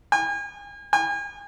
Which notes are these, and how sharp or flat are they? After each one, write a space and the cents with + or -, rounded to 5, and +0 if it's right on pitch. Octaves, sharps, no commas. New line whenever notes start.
G#5 -40
G#5 -40